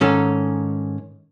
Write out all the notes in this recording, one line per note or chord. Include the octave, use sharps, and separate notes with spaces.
G#2 D#3 C#4 A4